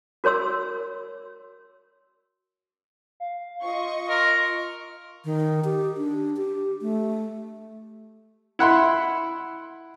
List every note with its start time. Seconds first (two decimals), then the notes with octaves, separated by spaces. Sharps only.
0.24 F#4 A#4 C#5 C6 E6
3.20 F5
3.63 F4 D#5 C#6
4.09 A#4 C6
5.25 D#3
5.64 G4
5.97 D4
6.37 G4
6.81 A3
8.59 E4 F#5 B5 C6